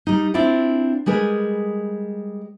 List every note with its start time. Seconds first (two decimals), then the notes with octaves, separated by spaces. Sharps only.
0.07 G3 D#4
0.34 C4 D4 E4 F4 D5 G5
1.06 G3 G#3 G#4 A#4 B4